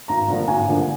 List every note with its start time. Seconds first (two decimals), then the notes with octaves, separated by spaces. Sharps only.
0.08 G#1 A#5
0.28 G2 D3 F3 A#3
0.48 G#1 G#5
0.68 G2 D3 F3 A#3